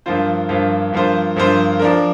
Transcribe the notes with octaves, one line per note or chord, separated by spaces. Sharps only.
G2 F3 A#3 F4 C5
G2 F3 A#3 F4 C5
G2 F3 A#3 F4 C5
G2 F3 A#3 F4 C5
F3 D4 A#4